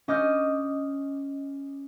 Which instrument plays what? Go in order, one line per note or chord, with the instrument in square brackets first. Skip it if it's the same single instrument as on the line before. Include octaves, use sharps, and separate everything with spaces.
[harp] C#4 D#5 D6 F6 G6